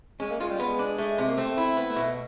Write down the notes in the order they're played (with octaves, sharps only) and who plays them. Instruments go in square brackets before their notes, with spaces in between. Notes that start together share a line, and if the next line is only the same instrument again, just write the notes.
[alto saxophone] G#3 [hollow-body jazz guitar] C#4
[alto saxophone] A#3
[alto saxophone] G#3 [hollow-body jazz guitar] F4
[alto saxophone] G3
[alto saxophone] G#3 [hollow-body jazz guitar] B3
[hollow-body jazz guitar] D4
[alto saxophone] G#3 [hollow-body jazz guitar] A3
[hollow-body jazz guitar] C3
[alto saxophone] A#3
[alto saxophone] A3 [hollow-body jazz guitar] C4
[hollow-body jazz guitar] E4
B3
[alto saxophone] A3
[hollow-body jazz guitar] B2
[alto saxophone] A3